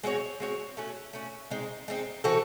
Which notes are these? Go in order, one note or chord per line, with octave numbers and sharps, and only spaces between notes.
G#3 C4 F#4 C#5
G#3 C4 F#4 C#5
A3 C#4 F#4
A3 C#4 F#4
G#3 C4 D#4
G#3 C4 D#4
E3 C4 F#4 A4